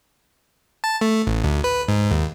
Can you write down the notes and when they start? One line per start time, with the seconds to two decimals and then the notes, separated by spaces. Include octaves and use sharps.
0.84 A5
1.01 A3
1.27 A1
1.44 D2
1.64 B4
1.89 G#2
2.11 D#2